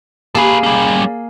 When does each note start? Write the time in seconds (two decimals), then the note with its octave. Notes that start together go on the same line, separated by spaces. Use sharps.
0.35 A#3 G#4 A4 B4
0.63 G3 C#4